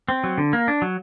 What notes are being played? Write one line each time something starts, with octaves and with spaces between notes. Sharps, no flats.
C4
F#3
D3
A#3
D4
F#3